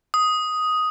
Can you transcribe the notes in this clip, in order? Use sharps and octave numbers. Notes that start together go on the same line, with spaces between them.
D#6